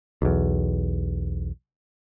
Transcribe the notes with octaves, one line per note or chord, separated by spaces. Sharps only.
B1 E2